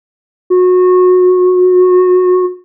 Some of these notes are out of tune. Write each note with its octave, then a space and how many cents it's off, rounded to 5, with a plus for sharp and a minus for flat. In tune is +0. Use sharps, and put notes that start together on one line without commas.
F#4 -25